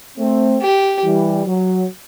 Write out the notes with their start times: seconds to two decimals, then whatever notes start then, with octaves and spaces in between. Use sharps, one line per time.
0.18 A3 C4
0.62 G4
1.03 E3 G3
1.46 F#3